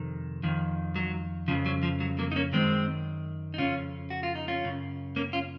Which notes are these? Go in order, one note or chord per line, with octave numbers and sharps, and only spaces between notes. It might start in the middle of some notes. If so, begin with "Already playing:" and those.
Already playing: F2 C3 D#3
F2 D#3
F#3
F2 C#3 F3
F#3
F3
F#3
F#3 A#3
D#4
A#3 C#4
F#2 D#3 G#3 C4
D#4
F2 C#3 C#4 F4
F#4
F4
D#4
C#4 F4
F#2 C#3
A#3 C#4
C#4 F4